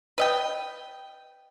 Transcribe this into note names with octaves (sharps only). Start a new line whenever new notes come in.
B4 D#5 G5